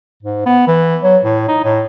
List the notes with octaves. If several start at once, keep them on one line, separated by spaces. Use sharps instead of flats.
G#2
B3
E3
F#3
A2
D#4
A2